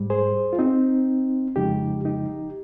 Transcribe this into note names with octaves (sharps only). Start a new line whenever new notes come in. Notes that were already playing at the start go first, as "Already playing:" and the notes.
Already playing: G#2 G3
G#4 C5
F4
C4 D#4
F2 C#3 F3 G#3 D#4 G4
D#4 G4